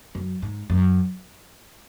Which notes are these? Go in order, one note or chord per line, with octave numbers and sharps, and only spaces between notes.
F#2
G#2
F#2